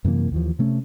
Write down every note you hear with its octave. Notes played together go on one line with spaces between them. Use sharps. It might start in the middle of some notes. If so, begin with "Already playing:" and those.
F#2 C3 E3 A#3
D#2 E3 F3
C3 A3 C#4